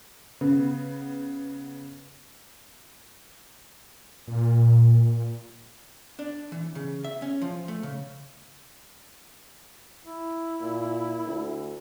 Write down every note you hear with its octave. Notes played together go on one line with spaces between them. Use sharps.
C#3 B3
A#2
D4
E3
C#3
E5
C#4
F3
A3
C#3
E4
A#2
D2